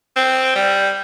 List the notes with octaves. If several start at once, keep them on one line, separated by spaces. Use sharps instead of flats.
C4
G3